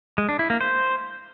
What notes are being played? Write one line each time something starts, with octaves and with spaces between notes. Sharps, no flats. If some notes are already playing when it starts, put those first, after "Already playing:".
G#3
D4
E4
A#3
C5